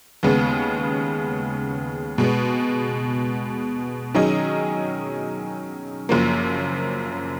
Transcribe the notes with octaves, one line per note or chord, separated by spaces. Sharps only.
D#2 C#3 G#3 B3
B2 G#3 B3
D#3 F#3 C#4 G#4 D#5
F#1 F#2 F3 A#3